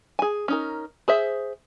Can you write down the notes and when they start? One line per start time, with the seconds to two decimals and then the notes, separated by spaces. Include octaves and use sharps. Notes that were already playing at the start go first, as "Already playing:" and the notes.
0.19 G#4 G#5
0.48 C#4 D#4 A#4
1.08 G#4 C5 E5